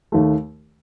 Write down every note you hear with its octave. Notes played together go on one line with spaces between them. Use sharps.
D#2 D#3 A3